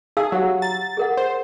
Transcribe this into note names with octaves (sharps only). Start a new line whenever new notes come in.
D#4 G#4 F5 E6
F#3 G4 F#5
A#5 A6
G#4 A#4 F#5
C5